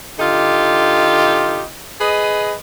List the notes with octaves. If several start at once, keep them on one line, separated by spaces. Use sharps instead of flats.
D3 D#4 F4 G4
G#4 B4 D#5